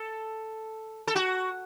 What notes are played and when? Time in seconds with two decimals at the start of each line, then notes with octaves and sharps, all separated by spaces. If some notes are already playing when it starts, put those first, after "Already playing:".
Already playing: A4
1.07 A4
1.15 F#4